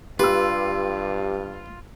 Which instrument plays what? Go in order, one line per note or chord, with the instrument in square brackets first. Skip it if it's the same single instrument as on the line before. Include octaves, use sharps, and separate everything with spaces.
[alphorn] G2 [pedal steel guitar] F4 [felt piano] G4 E6 [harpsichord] B4